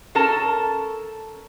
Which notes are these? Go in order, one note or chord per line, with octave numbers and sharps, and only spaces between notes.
C#4 A4 A#4 A5